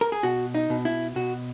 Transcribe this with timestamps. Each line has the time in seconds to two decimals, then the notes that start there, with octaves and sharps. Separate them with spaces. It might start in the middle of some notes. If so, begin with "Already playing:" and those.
0.01 A#4
0.12 G#4
0.23 B2 F#4
0.55 D#4
0.70 B2
0.85 E4
1.16 B2 F#4